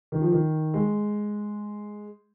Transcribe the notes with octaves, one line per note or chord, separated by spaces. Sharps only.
D#3
F3
D#3
G#3